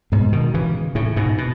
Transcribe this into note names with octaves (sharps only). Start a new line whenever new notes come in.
G#2 B2
B2 D#3
C#3 E3
A2 C#3
G#2 B2
B2